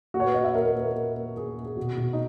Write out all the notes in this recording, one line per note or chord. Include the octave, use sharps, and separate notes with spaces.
A#2 F#4
C#5
B4
A#2 D#5
E5
A#2 A#4
A#4
A#2 B4
A#4
A#2 A#4
A#2
A#2 G#4
A#2
G#4
B2 F#4
B2
D#4